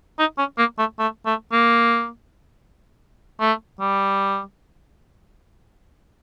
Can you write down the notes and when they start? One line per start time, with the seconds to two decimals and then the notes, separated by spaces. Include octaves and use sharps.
0.19 D#4
0.38 C#4
0.58 A#3
0.79 A3
0.99 A3
1.26 A3
1.52 A#3
3.40 A3
3.80 G3